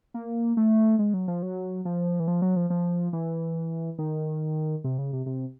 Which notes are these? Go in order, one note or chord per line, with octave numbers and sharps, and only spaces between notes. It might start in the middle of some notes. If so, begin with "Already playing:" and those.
A#3
A3
G#3
F#3
F3
F#3
F3
E3
F3
F#3
F3
F3
E3
D#3
C3
C#3
C3
C3